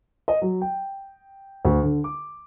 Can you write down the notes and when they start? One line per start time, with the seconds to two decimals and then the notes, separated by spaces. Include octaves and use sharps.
0.28 D#5
0.42 F#3
0.61 G5
1.65 D2
1.83 D3
2.04 D6